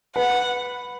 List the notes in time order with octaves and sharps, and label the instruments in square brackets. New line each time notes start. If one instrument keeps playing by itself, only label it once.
[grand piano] B4 [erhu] F#5